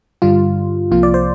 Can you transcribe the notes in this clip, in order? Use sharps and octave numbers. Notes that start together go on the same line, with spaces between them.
G2 D3 G3 F4
C2 C3 F3 A#3 F4
D5
C5